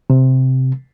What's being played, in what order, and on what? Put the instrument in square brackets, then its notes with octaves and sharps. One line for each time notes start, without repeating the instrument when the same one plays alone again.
[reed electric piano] C3